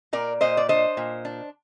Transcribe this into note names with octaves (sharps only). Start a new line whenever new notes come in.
A#2 A#4 D5
A#2 C5 D#5
D5
D4 C5 D#5
A#2
D4